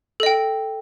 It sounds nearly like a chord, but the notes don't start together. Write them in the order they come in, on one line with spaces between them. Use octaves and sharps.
A4 D#5 G5